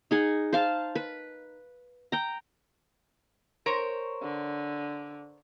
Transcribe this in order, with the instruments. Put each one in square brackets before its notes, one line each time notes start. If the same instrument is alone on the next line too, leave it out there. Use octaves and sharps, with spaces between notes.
[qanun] D#4 G#4 F#5
C5 F5 A5
B4
G5 A#5
[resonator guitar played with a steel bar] A#4 C5 C#5
[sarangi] D3